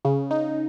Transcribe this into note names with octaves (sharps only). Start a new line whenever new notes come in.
C#3
D#4